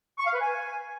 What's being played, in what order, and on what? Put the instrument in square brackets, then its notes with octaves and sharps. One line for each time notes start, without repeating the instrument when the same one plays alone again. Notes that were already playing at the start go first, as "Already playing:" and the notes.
[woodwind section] C#6
F5
B4
G#5